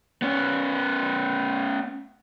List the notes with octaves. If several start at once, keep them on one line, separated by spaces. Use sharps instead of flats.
B3 C#4